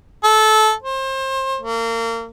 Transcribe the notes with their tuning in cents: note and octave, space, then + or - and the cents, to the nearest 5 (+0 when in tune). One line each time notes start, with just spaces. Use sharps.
A4 -20
C5 +30
A#3 -30